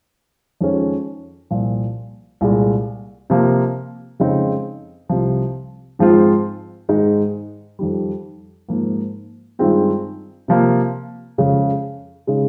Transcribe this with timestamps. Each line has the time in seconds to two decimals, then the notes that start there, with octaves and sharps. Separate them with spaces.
0.61 F2 D#3 G#3 C#4 F4
1.51 C2 A#2 F3
2.41 C2 A#2 G#3
3.30 C3 F3 A#3
4.20 F2 C#3 G#3 C4 D#4
5.09 C2 C3 F3
5.99 G#2 F3 G#3 C4 F4
6.89 G#2 D#3 G#3 D#4
7.79 F2 D#3 G3
8.69 G#2 F3 A#3
9.59 G2 D#3 G#3 C4 F4
10.48 C3 F3 A#3
11.38 F2 C#3 G#3
12.27 C#3 G#3 D#4